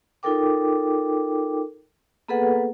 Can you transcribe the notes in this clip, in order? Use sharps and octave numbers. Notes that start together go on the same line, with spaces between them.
D#4 F4 A4 A#4 G5 D6
A#3 B3 G#4 A4 B4 F#5